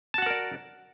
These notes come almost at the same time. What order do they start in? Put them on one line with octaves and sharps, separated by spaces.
A5 F#4 F#5 A#4 D5